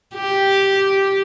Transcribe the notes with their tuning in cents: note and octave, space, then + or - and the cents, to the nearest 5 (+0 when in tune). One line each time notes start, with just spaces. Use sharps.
G4 -5